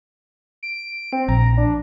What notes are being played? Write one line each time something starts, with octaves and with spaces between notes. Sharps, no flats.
D7
C4
A#1 A#5
D4